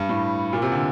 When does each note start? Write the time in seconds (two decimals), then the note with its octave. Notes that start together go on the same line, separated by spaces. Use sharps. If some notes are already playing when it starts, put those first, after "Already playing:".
Already playing: G2
0.09 A2
0.53 A#2
0.62 C3
0.72 D3